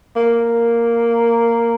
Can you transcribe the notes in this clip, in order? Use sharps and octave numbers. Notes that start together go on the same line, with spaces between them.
A#3